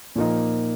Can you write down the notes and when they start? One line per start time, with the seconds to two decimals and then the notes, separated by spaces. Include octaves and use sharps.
0.16 A#2 F3 A#3 D#4